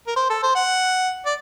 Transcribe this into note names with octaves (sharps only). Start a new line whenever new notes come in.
A#4
C5
A4
C5
F#5
D5